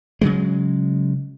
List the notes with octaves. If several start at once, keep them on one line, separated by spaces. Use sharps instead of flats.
C#3 F#3 G#3